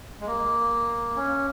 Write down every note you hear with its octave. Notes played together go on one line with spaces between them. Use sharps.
G#3
A#3
C#4